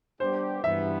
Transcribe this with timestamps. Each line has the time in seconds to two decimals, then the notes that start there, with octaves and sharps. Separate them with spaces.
0.20 G3 B3 D4 G4 C5
0.64 G2 E3 B3 E5